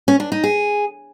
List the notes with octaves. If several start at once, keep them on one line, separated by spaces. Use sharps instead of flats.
C#4
D4
D#4
G#4